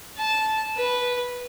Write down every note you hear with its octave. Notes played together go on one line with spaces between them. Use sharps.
A5
B4